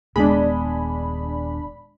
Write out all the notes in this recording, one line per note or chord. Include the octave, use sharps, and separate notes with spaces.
D#1 G#3 B3 D4 B5